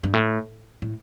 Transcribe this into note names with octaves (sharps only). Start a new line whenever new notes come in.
G2
A2
A2